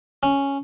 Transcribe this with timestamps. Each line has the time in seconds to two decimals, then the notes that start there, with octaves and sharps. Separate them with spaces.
0.23 C#4